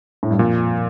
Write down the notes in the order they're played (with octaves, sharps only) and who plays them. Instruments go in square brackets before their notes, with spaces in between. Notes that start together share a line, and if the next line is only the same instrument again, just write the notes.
[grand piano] A2
G2
[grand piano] F2 [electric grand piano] A#2